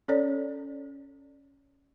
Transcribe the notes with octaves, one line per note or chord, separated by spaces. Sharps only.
C#4 A4 C#5 D5